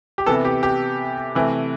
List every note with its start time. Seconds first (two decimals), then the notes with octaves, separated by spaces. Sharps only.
0.18 G4
0.26 C3 E3 B3 A4
0.45 G4
0.63 G4
1.35 C3 E3 A3